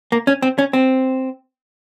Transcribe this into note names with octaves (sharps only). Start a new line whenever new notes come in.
A#3
C#4
C4
C#4
C4